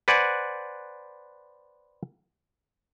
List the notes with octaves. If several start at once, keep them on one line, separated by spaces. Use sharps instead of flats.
B4 C5 D5 F#5 G#5